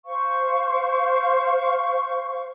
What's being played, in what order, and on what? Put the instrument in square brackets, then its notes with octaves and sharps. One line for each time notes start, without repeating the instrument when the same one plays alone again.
[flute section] C5 F5 C#6